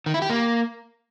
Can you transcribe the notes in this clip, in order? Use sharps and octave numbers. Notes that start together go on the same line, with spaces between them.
D#3
E4
G4
A#3